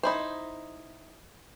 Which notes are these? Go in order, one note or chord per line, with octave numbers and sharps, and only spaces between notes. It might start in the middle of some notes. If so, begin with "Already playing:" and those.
D#4 E4 C5